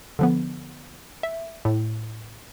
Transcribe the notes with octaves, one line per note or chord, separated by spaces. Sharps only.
D3 F3 B3
E5
A2